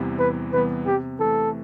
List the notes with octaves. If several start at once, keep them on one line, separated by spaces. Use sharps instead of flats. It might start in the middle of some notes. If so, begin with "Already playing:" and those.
Already playing: E2 C3 E3 G3 B3
E2 B4
C3 E3 G3 B3 B4
C3 G4
E3 A3 A4